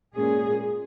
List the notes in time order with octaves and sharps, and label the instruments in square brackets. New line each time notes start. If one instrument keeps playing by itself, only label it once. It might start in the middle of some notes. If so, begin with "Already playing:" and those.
[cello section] A#2 G#3 C#4 G#4